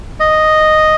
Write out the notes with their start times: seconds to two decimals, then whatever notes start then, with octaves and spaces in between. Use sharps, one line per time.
0.20 D#5